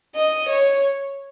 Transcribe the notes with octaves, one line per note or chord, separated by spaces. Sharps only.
D#5
C#5